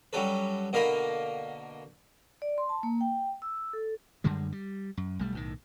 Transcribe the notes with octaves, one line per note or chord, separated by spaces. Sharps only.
F#3 G3 C#4 A4 B4
B2 D3 A#3 D#5 F5 B5
D5
C6
A5
A#3
G5
E6
A4
F#2 D3 G3 G#3
G3
F#2
B1 G3 A3
B1 A2 D#3